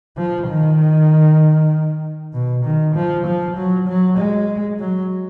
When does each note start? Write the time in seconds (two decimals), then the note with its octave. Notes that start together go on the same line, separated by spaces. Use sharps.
0.17 F3
0.48 D#3
2.34 B2
2.65 D#3
2.95 F3
3.26 F3
3.56 F#3
3.88 F#3
4.18 G#3
4.80 F#3